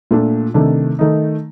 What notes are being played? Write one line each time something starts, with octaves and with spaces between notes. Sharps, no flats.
A#2 A3 D4
C3 D#3 A3 D4
D#3 A3 D#4